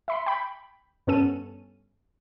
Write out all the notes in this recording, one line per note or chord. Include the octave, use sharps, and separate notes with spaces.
E5 B5 C6
G5 B5
G2 B3 C#4 A4 D#7